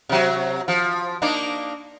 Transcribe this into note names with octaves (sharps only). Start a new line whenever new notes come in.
C3 F#3
F3
A#3 D4 D#4